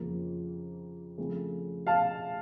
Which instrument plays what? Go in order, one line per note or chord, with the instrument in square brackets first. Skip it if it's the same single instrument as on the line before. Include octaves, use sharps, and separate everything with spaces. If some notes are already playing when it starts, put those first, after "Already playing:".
Already playing: [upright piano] F2 C#3 F3 A#3
C#3 F3 A3 C4
F5 A5